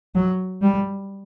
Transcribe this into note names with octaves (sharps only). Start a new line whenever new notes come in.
F#3
G3